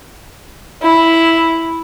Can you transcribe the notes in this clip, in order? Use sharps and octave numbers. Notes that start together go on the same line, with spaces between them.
E4